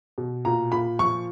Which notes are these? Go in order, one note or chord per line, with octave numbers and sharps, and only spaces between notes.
B2
A#2 A#5
A#2 B5
F3 C#6